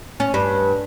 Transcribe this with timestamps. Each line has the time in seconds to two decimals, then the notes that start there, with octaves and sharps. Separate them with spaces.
0.20 C#4
0.34 G2